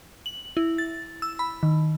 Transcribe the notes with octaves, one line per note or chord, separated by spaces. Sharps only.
F#7
E4
A6
E6
B5
D#3